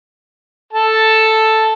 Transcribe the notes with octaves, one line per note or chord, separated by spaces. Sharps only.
A4 A5